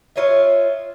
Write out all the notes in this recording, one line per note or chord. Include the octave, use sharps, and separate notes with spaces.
F4 C#5 D#5 E5